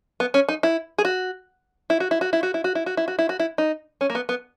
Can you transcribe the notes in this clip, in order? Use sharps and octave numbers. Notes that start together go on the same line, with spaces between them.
B3
C#4
D#4
E4
G#4
F#4
E4
F#4
E4
F#4
E4
F#4
E4
F#4
E4
F#4
E4
F#4
E4
F#4
E4
D#4
C#4
A#3
B3
B3